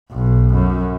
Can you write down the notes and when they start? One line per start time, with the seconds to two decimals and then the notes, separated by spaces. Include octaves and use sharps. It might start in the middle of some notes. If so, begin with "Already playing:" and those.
0.12 B1
0.53 F#2